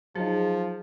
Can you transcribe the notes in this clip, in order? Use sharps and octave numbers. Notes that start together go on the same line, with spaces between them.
F3 F#3 D#4 G#4